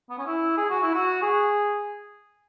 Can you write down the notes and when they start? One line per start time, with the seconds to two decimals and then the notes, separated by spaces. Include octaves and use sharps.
0.10 B3
0.18 C#4
0.27 E4
0.57 G#4
0.70 F#4
0.83 E4
0.94 F#4
1.22 G#4